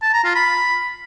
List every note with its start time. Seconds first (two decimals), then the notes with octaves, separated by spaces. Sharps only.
0.02 A5
0.13 A#5
0.24 F4
0.35 B5